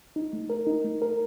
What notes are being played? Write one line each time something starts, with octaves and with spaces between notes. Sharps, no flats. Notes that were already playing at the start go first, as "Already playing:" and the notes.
D#4
A3
A#4
D#4
A3
A#4